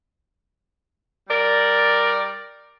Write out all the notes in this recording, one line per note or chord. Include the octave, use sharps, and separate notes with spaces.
G3 A#4 D5